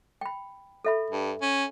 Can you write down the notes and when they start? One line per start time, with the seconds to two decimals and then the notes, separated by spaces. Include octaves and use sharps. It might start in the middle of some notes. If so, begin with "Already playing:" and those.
0.21 G5 B5
0.85 A4 E5 B5
1.11 G2
1.42 C#4